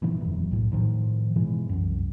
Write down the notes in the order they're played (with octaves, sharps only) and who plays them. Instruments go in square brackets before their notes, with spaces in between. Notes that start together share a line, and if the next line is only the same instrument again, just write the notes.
[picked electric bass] G2 A#2 D#3 E3
E1 A#1 F#2
B1 A2
A2 D#3 F3
G#2 B2 E3 G#3
C2 F#2